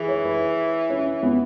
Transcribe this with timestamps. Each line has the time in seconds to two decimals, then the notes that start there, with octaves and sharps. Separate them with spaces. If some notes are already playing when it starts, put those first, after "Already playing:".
Already playing: E3 G#4
0.08 C#5
0.25 B4
0.89 C#4
1.23 B3